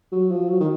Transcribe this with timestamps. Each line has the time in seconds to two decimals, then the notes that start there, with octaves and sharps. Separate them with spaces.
0.12 F#3
0.31 F3
0.49 F#3
0.60 D#3